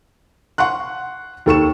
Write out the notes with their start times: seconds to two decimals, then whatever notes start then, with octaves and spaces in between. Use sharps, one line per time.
0.58 F#5 C6 C#6 F#6
1.46 D#2 A4 C#6 E7